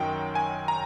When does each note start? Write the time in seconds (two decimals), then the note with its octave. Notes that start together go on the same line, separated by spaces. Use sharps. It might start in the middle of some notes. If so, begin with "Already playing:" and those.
Already playing: F#2 D#3 F#3 G5
0.35 G#5
0.68 A#5